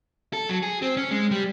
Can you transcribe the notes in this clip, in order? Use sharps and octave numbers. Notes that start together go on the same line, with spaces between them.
A4
F#3
G#4
C4
C#4
G#3
G3